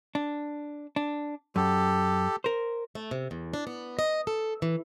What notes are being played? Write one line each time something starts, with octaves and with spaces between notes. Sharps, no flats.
D4
D4
F#2 G4 A4
A#4 C5
A3
C3
E2
D4
B3
D#5
A4
E3